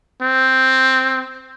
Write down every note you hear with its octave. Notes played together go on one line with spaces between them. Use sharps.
C4